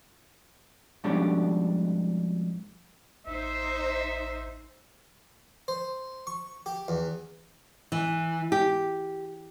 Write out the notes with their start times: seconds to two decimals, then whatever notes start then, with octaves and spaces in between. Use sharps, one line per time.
1.04 F2 G#2 B2 G3 C#4 D4
3.27 A1 D#4 C5 E5
5.68 C5
6.27 C#6
6.66 G4
6.88 E2
7.92 E3
8.52 G4